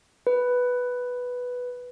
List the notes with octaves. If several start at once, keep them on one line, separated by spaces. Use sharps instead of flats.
B4